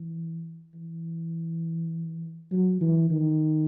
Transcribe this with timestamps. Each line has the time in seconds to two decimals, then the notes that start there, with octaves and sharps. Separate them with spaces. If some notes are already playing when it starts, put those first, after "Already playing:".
Already playing: E3
0.74 E3
2.51 F#3
2.81 E3
3.10 D#3